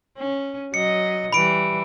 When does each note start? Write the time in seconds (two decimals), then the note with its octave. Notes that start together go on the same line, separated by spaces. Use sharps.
0.18 C#4
0.74 F#3 D#5 C#7
1.33 E3 G3 B5 D7